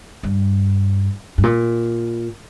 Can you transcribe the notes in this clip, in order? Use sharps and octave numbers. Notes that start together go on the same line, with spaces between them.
G2
G2
A#2